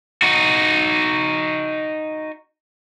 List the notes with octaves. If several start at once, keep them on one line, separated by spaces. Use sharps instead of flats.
D#4 F#4